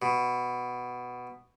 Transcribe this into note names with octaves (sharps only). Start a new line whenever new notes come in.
B2